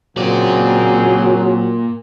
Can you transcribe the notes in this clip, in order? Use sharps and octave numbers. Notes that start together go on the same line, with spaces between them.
A#2 C#3 F#3 A#3 C4 G#4 D5